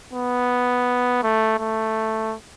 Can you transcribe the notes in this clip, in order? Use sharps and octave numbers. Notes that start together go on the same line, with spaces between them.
B3
A3
A3